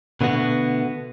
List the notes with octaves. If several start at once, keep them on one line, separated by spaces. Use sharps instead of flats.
B2 D3 A3 B3 F#4